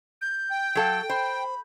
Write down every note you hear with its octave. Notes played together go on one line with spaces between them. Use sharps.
G6
G5
F#3 A4 F5
C5 B5